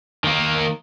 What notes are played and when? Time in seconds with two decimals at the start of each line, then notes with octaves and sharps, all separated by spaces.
0.24 D#3 A#3